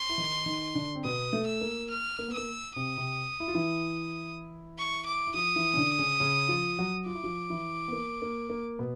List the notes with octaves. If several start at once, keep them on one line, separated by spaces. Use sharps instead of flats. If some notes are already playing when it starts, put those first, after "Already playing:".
Already playing: C6
E4
D#3 D#4
D#3 D#4
D3 D4
C4
B2 B3 D#6
A3
E6
A#3
F6
A#3
B3
A#3 E6
C3 C4 D#6
C3 C4
E4
F4
E3 E4
C#6
D6
E4
F3 F4 D#6
E3 E4
C#4
D3 D4
C#3 C#4
C#3 C#4
F3 F4
F#3 F#4
F4 D6
E4
F3 F4
E3 E4
B3
A#3
A#3
A#3
B2 B3